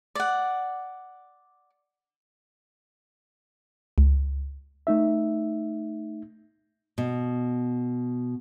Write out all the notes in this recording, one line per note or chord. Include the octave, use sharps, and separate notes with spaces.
D5 F#5
C#2
A3 D#4 E5
B2